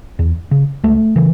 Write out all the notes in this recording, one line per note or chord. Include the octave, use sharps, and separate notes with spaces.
E2
C#3
C#2 A3
C#3 E3